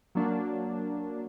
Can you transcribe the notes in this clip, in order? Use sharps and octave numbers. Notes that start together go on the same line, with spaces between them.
F#3 A#3 D4